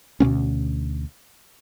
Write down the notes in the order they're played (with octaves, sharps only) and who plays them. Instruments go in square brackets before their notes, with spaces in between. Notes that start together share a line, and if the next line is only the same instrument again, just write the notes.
[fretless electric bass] D2 B2 B3 C#4